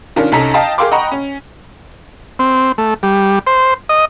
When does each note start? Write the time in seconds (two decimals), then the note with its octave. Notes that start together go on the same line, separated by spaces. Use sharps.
0.16 D#3 C#4 D4 F4 A#4
0.32 C2 C#4 D#4 A4 A#5 B6
0.54 D#5 F5 G5 A5 A#5
0.78 G#4 A#4 F5 G5 C6 D6
0.92 D#5 F#5 G5 A#5 B5 C#6
1.12 C#4
2.39 C4
2.78 A3
3.03 G3
3.47 C5
3.89 D#5